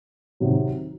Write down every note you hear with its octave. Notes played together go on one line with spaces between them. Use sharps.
C3 D#3 F#3